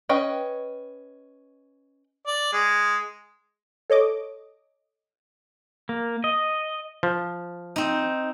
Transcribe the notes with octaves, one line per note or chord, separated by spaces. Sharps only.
C#4 B4 D#5 G5
D5
G#3
A4 C#5 D#5 D6
A#3
D#5
F3
C4 D#4